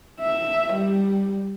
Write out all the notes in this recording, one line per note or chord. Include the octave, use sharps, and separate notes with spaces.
E5
G3